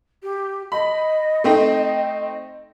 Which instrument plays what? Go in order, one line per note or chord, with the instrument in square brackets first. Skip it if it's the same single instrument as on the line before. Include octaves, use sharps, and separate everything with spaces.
[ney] G4
[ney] D#5 [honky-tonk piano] B5
[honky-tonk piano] A3 C4 D#4